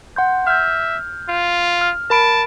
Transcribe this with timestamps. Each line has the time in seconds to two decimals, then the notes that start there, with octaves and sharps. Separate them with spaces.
0.16 F#5 C6 G6
0.47 E5 F6 G6
1.29 F4
1.81 F6
2.10 A#4 A5 B5 D7